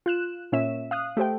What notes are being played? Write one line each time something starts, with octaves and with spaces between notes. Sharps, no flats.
F4 F#6 E7
A#2 C#4 C#5 E5 E7
F5 D#6 F#6
A3 G4 C5 G5